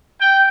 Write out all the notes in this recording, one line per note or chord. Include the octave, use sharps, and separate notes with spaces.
G5